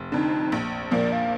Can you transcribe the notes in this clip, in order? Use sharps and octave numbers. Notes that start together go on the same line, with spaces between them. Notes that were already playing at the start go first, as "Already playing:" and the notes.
Already playing: F1
F2 D3 D#4
A#1
A#2 F3 A#3 D5
F5